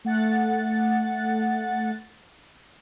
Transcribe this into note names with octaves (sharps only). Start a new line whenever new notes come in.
A3 F#5 A6